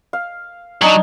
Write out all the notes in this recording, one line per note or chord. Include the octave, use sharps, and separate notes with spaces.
F5
F#3 D4 D#4 G#5